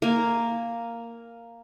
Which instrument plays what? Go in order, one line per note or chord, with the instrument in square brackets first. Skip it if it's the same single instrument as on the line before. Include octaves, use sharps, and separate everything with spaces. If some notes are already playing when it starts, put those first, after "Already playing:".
[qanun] A#3 G#5